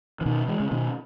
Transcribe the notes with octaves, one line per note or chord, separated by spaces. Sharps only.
E3
B2 D#3
E3 G#3
C#3
B2 D#3